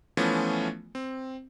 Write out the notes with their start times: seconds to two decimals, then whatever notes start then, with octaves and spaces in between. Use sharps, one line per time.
0.17 E3 F3 A3 B3 C#4 F4
0.95 C4